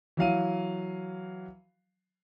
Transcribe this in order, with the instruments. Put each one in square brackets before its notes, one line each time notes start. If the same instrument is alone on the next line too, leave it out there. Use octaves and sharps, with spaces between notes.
[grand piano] E3 F#3 F5 D#7